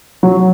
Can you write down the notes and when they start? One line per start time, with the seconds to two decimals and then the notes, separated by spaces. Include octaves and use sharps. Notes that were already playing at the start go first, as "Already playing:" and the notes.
0.23 F#3